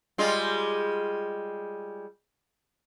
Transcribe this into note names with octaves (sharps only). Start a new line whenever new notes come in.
G3 G#3 F4